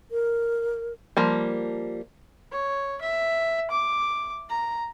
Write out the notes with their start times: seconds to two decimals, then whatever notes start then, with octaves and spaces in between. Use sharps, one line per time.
0.11 A#4
1.17 F3 G3 A#3
2.51 C#5
3.01 E5
3.71 D6
4.50 A#5